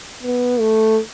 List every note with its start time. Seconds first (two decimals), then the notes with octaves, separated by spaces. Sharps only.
0.23 B3
0.60 A3